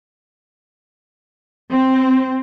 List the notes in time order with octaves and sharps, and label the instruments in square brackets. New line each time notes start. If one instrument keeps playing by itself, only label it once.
[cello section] C4